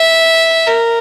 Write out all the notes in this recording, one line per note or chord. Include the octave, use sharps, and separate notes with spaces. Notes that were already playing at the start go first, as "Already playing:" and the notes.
Already playing: E5
A#4